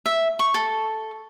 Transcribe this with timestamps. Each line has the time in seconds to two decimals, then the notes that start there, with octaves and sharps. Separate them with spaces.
0.06 E5
0.39 C#6
0.54 A4